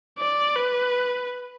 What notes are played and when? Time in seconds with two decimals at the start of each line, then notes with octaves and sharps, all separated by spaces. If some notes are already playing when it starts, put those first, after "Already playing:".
0.19 D5
0.55 B4